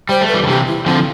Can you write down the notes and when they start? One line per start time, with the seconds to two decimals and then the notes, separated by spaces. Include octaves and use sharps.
0.09 G3 C5
0.21 A3
0.28 B4
0.34 E3 G3
0.43 D3
0.47 C3 E3 G4
0.67 E4
0.86 D3 F3 C4